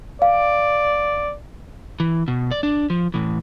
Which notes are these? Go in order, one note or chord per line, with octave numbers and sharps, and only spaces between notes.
D5 F5
E3
B2
D5
D4
F3
A2 E3